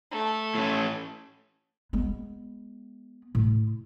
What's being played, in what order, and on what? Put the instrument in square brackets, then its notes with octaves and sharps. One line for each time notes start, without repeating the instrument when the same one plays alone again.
[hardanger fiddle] A3
[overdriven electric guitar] A2 C#4
[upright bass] G#3 B3
A2